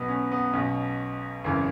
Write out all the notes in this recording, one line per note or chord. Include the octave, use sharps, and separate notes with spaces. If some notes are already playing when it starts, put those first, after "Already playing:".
Already playing: B1 B2 B3
C#4
B3
B1 B2 C#4
G#1 F#2 C#3 E3